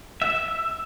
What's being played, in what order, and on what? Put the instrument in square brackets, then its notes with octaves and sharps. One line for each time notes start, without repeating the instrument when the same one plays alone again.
[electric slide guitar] E5